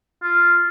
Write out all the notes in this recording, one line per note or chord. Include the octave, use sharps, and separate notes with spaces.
F4